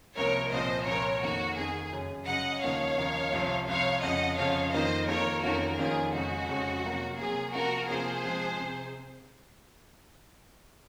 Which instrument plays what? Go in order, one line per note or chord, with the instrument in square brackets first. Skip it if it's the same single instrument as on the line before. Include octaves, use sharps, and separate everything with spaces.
[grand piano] C2 C3 F3 A#3 [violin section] A#4 C#5
[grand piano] C2 A#2 F3 C4 F4 [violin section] C5 D#5
[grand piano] C2 A#2 F3 C4 F4 [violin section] A#4 C#5
[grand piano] F2 D#3 A#3 [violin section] F#4
[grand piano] F2 D#3 A#3 [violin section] G#4
[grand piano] F#2 C#3 F#3
[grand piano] F#2 C#3 F#3 [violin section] D#5 F#5
[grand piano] D#2 C#3 F3 A#3 D#4 [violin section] C#5 F5
[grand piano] D#2 C#3 F3 A#3 D#4
C2 C3 F3 C4
[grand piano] C2 C3 F3 C4 [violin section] C#5 F5
[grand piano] F2 C#3 F3 [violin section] D#5 F#5
[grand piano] F2 C#3 F3 [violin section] C#5 F5
[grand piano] F2 D#3 A#3 F4 [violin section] C5 D#5
[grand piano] F2 D#3 A#3 F4 [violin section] A#4 C#5
[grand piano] F2 D#3 A#3 C#4 F4 [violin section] F#4 A#4
[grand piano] F2 D#3 A#3 C#4 F4 [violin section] G#4
[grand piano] F2 C#3 G#3 [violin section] F#4
[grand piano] F2 C#3 G#3
C3 F#3 A#3
[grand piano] C3 F#3 A#3 [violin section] G#4
[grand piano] C3 F3 A#3 F4 [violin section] F#4 A#4
[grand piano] C3 F3 A#3 F4 [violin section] G#4 C5
[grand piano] C3 F3 G#3
C3